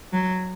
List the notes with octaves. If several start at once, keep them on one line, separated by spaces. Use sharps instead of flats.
F#3